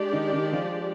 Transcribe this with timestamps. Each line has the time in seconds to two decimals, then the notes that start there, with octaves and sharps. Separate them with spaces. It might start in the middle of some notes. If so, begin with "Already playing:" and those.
Already playing: G#3 D4 G4 D5
0.13 D#3 D#4
0.33 D#3 D#4
0.53 F3 F4